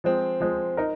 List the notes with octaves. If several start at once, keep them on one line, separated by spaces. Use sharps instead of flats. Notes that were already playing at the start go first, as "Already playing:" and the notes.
F3 G#3 C4
F3 G#3 C4
D#4 A#4